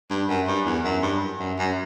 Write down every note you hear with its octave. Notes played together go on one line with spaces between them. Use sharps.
G2
F#2
G2
E2
F#2
G2
F#2
F#2